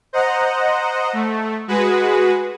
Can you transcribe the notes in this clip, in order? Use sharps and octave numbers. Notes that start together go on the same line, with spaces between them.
C5 D#5 F#5 A#5
A3
G#3 F#4 G#4 B4